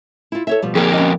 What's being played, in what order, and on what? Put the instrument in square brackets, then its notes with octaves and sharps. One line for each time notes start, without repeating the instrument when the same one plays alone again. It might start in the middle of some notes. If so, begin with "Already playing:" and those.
[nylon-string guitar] E4 F4
A4 C#5 E5
B2 F3 G3
[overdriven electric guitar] F2 A#3 [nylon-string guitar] G#4 G5
[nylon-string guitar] C#4 D#5